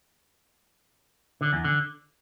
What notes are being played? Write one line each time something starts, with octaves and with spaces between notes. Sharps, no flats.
D3
E2
D3